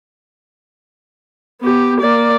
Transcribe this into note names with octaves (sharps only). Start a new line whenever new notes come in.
B3 G4
A#3 D5